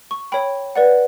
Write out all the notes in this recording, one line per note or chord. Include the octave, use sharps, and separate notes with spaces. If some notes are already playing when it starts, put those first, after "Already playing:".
C#6
C#5 G5 B5
B4 D5 F#5